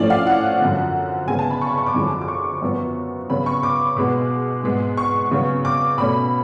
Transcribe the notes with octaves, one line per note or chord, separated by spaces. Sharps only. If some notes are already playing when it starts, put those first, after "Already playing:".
Already playing: A2 F3 A3 C#4 D5
F5
F#5
F#2 D3 F3
C#3 G#3 B3 G#5
A5
B5
C#6
B5
C#6
D6
F#2 D3 F3 G#3
D6
C#6
F#2 F3 B3
C#3 F#3 B3 B5
C#6
D6
B2 G#3 B3
G#2 G#3 B3
C#6
C#3 F#3 B3
D6
B2 A3 C#4 B5